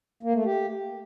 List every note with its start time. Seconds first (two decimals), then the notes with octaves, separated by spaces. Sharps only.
0.23 A#3
0.34 A3
0.45 G4